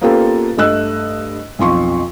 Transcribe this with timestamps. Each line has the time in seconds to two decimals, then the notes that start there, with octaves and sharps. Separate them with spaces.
0.01 A#3 B3 C#4 F4 G4 A4
0.57 G2 A3 D#5 E6 F#6
1.59 B1 F2 F4 C6 C#6